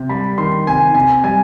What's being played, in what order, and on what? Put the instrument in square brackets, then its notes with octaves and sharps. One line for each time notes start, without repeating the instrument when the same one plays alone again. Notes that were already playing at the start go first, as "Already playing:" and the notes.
Already playing: [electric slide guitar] C3
[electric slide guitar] G3 [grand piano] B5
[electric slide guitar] D#3 [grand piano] C6
[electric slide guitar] C3 [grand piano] G#5
[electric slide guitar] C3 [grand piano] G#5
[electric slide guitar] G3 [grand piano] G#5